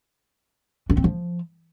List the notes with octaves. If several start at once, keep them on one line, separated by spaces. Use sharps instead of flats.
D4
C4
F3